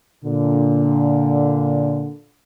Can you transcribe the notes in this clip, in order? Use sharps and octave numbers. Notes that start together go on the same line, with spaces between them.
A#2 D3